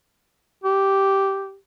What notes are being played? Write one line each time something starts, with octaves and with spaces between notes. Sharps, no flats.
G4